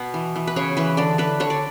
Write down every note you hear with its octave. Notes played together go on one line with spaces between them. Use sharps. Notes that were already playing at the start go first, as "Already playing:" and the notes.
Already playing: B2 B3
E3
E3
B4
C#3 C#5
E3 B4
D3 D5
D3 B4
D3 C#5
D5